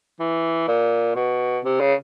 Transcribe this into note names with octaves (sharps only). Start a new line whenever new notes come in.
E3
A#2
B2
C3
C#3